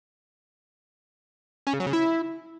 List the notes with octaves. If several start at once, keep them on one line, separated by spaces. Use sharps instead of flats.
C#4
C#3
F#3
C#3
E4